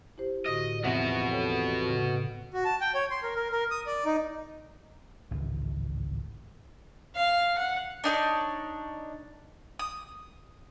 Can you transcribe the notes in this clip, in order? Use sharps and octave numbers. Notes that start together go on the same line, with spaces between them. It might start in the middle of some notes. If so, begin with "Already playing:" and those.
E4 G4 C5
A2 D3 F#4 D#5
E2 C3 F3 B3 F#4 E5 A#6
A4 C#5 G5
A2 C#3 G5
F#4
A5
G5
C#5
C6
A#4
A#4
A#4
D#6
D5
D#4
G#1 C#2 A2 E3
F5
F#5
D4 D#4 B4 C#5
D#6